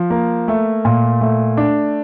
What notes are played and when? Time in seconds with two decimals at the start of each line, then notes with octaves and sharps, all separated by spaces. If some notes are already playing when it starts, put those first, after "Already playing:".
Already playing: F3
0.10 A#3
0.48 A3
0.85 A#2
1.21 A3
1.57 D4